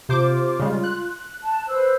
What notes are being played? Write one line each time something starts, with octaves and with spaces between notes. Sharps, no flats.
C3 F4 C5 D6
C#3 G3 G#3
F#6
A5
B4 C5 E6